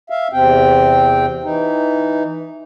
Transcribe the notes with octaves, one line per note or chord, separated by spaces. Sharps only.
E5 F5
E2 C3 C4 G5
E3 D#4